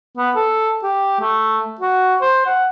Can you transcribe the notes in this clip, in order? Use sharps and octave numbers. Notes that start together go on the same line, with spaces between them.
B3
A4
G4
A3
F#4
C5
F#5